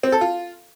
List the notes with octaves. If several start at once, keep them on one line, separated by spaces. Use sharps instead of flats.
C4
A4
F4